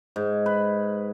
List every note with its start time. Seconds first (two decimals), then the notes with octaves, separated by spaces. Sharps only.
0.16 G#2
0.46 B4